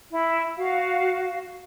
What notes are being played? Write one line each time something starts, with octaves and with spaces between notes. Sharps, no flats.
E4
F#4 F5